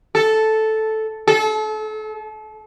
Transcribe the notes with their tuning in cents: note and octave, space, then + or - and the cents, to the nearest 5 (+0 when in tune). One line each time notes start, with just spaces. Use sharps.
A4 -5
A4 -35